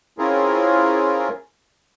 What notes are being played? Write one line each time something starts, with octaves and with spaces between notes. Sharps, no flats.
C4 C#4 E4 F4 G#4 A#4